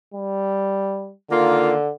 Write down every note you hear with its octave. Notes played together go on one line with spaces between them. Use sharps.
G3
D3 D#3 A#3 F4